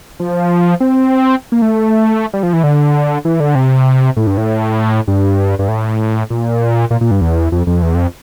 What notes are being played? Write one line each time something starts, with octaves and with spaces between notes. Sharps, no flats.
F3
C4
A#3
A3
G3
F3
E3
D3
E3
D3
C3
A2
G2
A2
G2
G2
A2
A#2
A#2
A#2
G2
E2
F2
F2
E2
F2